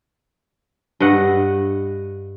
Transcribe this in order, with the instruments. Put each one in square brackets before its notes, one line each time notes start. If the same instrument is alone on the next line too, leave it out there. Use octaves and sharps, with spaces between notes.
[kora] G2 D#5 F#5